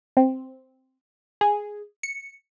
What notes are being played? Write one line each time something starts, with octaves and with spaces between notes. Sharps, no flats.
C4
G#4
C#7